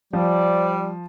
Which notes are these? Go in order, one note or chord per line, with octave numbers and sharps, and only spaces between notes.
F3 G3 C5 D5